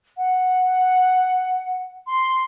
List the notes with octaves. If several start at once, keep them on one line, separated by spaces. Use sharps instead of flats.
F#5
C6